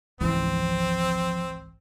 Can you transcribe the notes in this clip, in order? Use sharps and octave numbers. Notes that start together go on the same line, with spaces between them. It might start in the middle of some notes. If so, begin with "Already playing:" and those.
G#1 C#2 E3 F3 C4